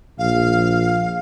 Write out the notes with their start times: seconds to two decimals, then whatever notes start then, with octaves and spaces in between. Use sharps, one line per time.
0.19 A#1 F5